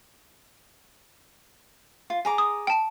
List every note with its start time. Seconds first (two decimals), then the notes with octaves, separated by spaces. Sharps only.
2.10 F4
2.25 G#4 A#5 D6
2.38 D#6
2.67 G5 A5